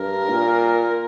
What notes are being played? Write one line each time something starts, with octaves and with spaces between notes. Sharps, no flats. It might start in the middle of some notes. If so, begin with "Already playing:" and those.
Already playing: G2 A#4
A#2